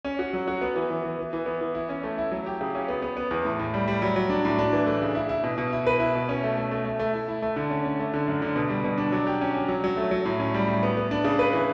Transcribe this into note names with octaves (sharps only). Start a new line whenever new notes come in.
C#4
F#4
F#3
F#4
B3
E3
E3
E3
E3
E3
B3
E3
E4
C#4
A3
E4
F#3
G4
C#3
C#4
B3
B3
B3
E2
A2
A2
G3
G3
F#3
F#3
D4
A2
D4
E3
A3
C#3
E4
E4
B2
B2
E4
B4
E4
B2
C#4
A3
A3
A3
A3
A3
E4
E4
A3
D3
C#4
C#4
A3
D3
F#2
D3
B2
G3
B2
D4
F#3
G4
C#4
C#4
F#3
F#3
A3
F#3
A2
C#4
G3
A2
B3
B3
D4
C#3
B4
E3